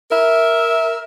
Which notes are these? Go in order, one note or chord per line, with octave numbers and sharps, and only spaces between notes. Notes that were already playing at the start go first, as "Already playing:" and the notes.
A#4 E5